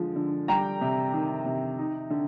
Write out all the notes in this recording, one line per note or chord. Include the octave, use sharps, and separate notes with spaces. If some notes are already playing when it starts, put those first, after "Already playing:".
Already playing: D3 F3 G#3
D3
G3 G5 A#5
C3
D#3
C3
D#4
D3